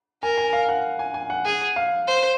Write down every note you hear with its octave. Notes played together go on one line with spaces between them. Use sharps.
A#4 G#5
G#5
F5
F#5
G#5
G#5
F#5
G#4 F#5
F5
C5